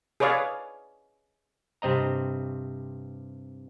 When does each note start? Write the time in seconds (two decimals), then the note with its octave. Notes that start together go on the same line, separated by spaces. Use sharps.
0.20 G#4 B4 C#5 D5 F5
1.82 G2 C3 C4 D#5 A#5